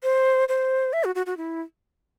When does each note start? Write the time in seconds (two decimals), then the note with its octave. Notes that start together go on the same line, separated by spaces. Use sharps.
0.03 C5
0.48 C5
0.93 E5
1.04 F#4
1.15 F#4
1.26 F#4
1.37 E4